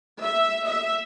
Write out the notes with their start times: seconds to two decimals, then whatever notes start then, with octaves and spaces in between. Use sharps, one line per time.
0.21 E5
0.66 E5